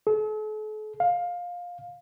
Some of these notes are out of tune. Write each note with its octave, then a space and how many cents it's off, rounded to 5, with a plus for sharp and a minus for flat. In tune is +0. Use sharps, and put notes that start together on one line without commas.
A4 -45
F5 +15